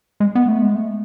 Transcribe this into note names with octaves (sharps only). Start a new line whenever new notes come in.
G#3
B3
A3
G#3
A3